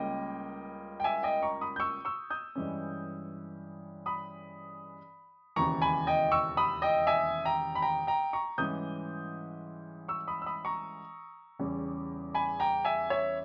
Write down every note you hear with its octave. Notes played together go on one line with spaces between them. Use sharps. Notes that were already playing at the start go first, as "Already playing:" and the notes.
Already playing: C#2 C#3 G3 A#3 C#4 D#5 G5
G5
E5 G#5
D#5 G5
A#5 C#6
B5 D#6
G6
C#6 E6
C#6 E6
D#6 G6
G2 E3 G#3 C#4
B5 D#6
E1 D#2 C#3 E3 A#5 C#6
G#5 B5
D#5 G5
C#6 E6
B5 D#6
D#5 G5
E5 G#5
G5 A#5
B5
G5 A#5
G5 A#5
A#5 C#6
G#2 E3 G3 C#4 D#6 G6
C#6 E6
B5 D#6
E6
B5 D#6
A#5 C#6
E2 C#3 G3 C#4
G#5 B5
G5 A#5
E5 G#5
C#5 E5